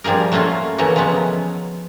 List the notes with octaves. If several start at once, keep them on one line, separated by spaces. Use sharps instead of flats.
F3 G3 A#3 G#4 A#4
F#3 A3 A#3 C#4 F4
C#3 E3 F#3 A3 A#3 C#4
F3 F#3 G#3 B3 C#4